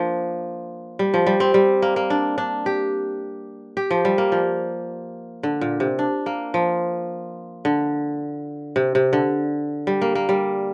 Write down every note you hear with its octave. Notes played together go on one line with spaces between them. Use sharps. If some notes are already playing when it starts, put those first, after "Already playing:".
Already playing: F3 A#3 D4
G3
F3
G3
C4
G3
A#3
A#3
D4
D4
G4
G4
F3
G3
A#3
F3
D3
A#2
C3
D4
A#3
F3
D3
C3
C3
D3
G3
A#3
A#3
G3